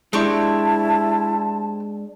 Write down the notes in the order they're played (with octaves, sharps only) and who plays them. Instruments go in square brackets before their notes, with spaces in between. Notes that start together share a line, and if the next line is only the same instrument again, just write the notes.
[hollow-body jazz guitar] G#3 D4 [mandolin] C4 G4 C#6 [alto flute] E4 [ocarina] A5